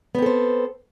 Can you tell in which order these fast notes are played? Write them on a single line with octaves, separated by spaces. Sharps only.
B3 C4 A4 C5